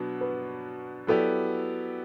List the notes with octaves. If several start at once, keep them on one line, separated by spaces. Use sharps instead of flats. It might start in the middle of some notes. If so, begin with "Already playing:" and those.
Already playing: B2 F#3 B3 D4
B4
F#3 B3 E4 G4 A4 D5